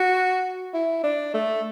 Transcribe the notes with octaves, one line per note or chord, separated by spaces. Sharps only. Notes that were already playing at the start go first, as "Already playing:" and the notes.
Already playing: F#4
E4
D4
A3